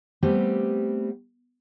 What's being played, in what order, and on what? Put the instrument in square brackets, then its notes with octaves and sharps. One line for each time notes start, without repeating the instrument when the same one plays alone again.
[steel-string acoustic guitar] G3 A3 B3 C4 G4 C5